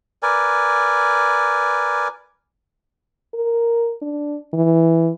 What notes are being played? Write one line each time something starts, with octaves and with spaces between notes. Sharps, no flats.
A#4 B4 D5 G#5
A#4
D4
E3